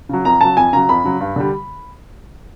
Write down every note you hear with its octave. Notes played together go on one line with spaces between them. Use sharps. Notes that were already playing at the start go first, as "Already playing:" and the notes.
C#3 F#3
F2 A#5
C#3 F#3 A5
F2 G#5
C#3 F#3 A#5
F2 B5
C#3 F#3
G2
D3 G3